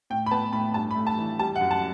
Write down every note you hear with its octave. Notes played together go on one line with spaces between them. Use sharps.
A2 G5
B5
B3 A5
A2 B5
G2 A5
B5
A3
A5
E3
G3 A5
F#5
F#2
A5